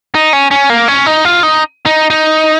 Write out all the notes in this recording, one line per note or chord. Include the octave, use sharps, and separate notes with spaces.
D#4
C#4
C#4
A#3
C#4
D#4
F4
D#4
D#4
D#4